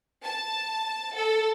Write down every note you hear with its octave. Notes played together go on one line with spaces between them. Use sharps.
A5
A4